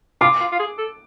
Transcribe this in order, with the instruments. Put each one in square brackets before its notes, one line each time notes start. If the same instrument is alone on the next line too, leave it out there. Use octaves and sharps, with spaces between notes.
[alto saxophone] F4 [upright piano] D6
[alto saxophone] F4
F4
G#4
A4